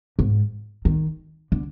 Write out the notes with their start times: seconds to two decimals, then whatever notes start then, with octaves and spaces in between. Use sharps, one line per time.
0.19 G#2
0.85 D#3
1.52 D3